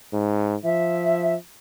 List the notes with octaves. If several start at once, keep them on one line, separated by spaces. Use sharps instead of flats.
G#2
F3 E5